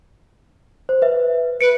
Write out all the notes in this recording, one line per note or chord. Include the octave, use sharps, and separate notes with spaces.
C5
B4 E5
B4 C#7 D7